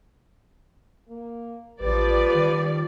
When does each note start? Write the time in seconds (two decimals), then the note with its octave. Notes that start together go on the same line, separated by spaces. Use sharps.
1.09 A#3
1.80 A1 F3 G3 B4 D5
2.34 D#3